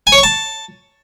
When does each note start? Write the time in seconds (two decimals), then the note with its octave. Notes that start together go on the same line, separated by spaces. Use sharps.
0.07 G#5
0.12 C#5
0.18 C#6
0.23 A5